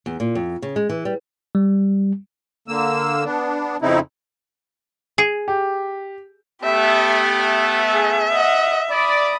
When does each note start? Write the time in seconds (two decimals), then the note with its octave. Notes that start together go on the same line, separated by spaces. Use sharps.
0.06 E2
0.20 A#2
0.35 F2
0.62 C#3
0.76 G#3
0.89 E3
1.05 G3
1.55 G3
2.68 D3 A#3 E6
3.25 B3 D4
3.82 F2 C#3 C4 D#4 E4
5.18 G#4
5.48 G4
6.64 A3 B3 G4 E5
7.43 E5
7.93 G#4
8.33 D#5 F#5
8.91 D5 B5 D#6